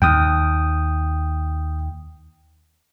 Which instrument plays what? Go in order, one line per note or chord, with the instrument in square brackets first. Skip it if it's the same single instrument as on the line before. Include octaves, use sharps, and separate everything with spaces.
[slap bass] D#2 [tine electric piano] G5 D#6